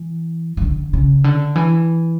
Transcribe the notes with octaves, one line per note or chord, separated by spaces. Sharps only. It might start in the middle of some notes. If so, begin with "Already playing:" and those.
Already playing: E3
E3
D3
C#3
D3
E3